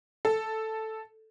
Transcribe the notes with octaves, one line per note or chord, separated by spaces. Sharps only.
A4